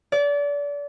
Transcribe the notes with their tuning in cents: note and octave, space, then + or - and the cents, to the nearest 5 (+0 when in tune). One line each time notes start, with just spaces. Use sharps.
D5 -30